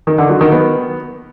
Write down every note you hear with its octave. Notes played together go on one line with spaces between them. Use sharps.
D#3
D3
F#3
D#3
B3